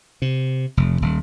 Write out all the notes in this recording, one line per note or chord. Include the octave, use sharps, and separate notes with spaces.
C3
F1
D#1